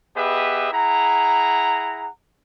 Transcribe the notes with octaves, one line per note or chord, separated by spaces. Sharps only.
B3 G4 G#4 B4 D#5 E5
E4 G#4 F#5 A#5